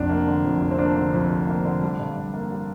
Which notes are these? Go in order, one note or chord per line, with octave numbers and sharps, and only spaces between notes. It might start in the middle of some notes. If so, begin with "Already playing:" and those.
Already playing: F1 F2 D4
A#3
D3
F2
F1
C4
A#3 D4
D3
F2
F1
A#3
D3
G3
G2
G2
A#3
G3